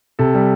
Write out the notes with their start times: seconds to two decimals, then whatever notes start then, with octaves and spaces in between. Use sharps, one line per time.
0.19 C3 A4
0.34 G3